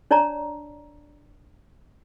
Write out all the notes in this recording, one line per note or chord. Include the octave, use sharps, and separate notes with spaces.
D4 C#5 D5 A5 A#5